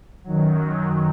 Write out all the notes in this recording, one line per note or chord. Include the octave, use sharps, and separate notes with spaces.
F#2 D#3 F#3